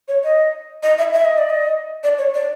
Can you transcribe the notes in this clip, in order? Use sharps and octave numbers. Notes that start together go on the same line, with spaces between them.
C#5
D#5
D#5
E5
E5
D#5
D5
D#5
D5
C#5
D5